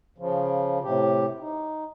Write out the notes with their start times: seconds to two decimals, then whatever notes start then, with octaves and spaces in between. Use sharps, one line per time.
0.18 C#3 F3
0.83 A2 C3 G4
1.40 D#4